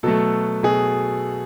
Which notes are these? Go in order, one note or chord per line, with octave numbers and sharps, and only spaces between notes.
B2 F#3 A3 A4
B2 G#4